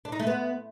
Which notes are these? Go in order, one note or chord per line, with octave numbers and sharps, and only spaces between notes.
D4
D#4
A3
B3